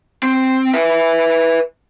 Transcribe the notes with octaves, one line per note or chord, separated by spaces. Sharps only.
C4
B4 E5